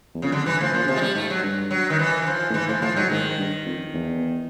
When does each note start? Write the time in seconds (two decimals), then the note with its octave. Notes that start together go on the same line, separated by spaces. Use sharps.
0.15 E2
0.22 F2 C#3
0.32 F#2 D3
0.46 G2 E3
0.60 A2 F3
0.74 A#2 F3
0.83 C#3
0.88 C3 F3
0.96 G#3
1.01 G3
1.15 G#2 A3
1.30 F#3
1.43 G2
1.71 F#3
1.90 D#3
1.99 E3
2.22 E3
2.27 F3
2.50 A2
2.54 G#2 E3
2.68 A2 F3
2.82 A2 F3
2.96 G#2 F#3
3.10 G#2 D#3
3.38 G2
3.66 F2
3.94 E2